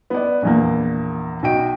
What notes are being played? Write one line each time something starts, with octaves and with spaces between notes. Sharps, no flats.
B3 D5
A#1 E2 A#3
B1 F#4 G5 D7